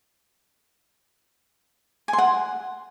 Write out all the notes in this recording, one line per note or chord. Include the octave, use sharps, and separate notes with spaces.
G#5
C6
F#5